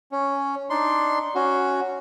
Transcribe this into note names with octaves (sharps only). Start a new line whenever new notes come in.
C#4
D4 D#4 C6
C#4 F#4